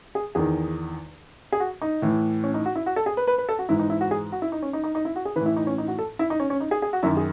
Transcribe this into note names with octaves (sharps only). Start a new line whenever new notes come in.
G#4
E2 D#3 G#4
G#4
F#4
D#4
A2 E3
C#4
D#4
F#4
E4
F#4
A4
G#4
B4
B4
B4
A4
F#4
G#2 E3 E4
D#4
E4
F#4
G#4
F#4
E4
D#4
C#4
D#4
D#4
D#4
E4
F#4
G#4
A2 E3 B4
E4
D#4
C#4
D#4
F#4
A4
E4
D#4
C#4
C#4
D#4
G#4
G#4
F#4
F#2 D#3 E4
G#4